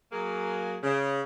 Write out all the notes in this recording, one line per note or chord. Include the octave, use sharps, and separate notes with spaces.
F#3 A#3 G#4
C#3